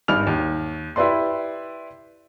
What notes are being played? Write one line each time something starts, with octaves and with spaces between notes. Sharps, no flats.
G#1 G2 F6 F7
D#2
E4 G4 B4 D5 C6